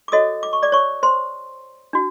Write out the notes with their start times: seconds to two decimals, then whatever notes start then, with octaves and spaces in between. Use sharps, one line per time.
0.08 D6
0.12 F#4 A4 C#5 D#5 D#6
0.43 D6
0.53 C#6
0.63 D5 D6
0.72 C#5 C#6
1.03 C5 C6
1.93 D4 F#4